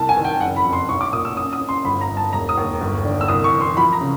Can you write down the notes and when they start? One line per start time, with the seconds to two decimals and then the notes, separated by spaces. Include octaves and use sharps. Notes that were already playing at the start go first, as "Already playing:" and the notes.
Already playing: C2 A5
0.09 G#5
0.17 D#3
0.25 G5
0.40 F#1 F#5
0.56 B5
0.65 F2
0.73 C6
0.89 B1 C#6
1.01 D6
1.13 A#2 D#6
1.25 E6
1.37 C#4 D#6
1.53 D#6
1.61 C#4
1.69 C6
1.84 G1 B5
2.01 A#5
2.09 G1
2.17 A5
2.33 E1 A#5
2.49 D#6
2.57 D#2
2.81 G1
3.05 D3
3.21 E6
3.28 C2 D#6
3.44 C#6
3.53 E3
3.61 C6
3.77 F3 B5
3.93 A#5
4.01 C#3